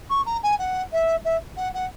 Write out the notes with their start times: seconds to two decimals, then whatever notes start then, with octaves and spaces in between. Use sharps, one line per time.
0.09 C#6
0.26 A#5
0.43 G#5
0.59 F#5
0.92 E5
1.24 E5
1.57 F#5
1.74 F#5